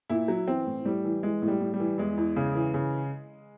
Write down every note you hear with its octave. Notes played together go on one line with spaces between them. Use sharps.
A#2 E4
F#3
E3 C4
A2
A2 G3
E3
E3 G#3
A2
G3
A2
G3
E3
E2 G#3
E2
C#3
E3
C#3